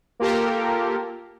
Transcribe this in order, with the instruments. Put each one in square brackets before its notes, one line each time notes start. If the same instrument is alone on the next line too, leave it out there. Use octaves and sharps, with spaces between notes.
[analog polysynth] A#3 F4 G4 A4 A#4